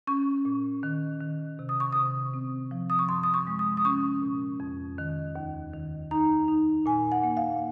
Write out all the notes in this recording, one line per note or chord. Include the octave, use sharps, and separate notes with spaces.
C#4 C#6
A#2
D#3
D#3
C3
D#6
C#6
C3 D#6
C4
F3
D#6
C#6
F#2 C6
D#6
C#6
G#3
D#6
D#6
C#4 C#6
A#2
F2
D#3
D#2
D#3
D#4 A#5
D#4
A#2 G#5
F#5
A#3
F5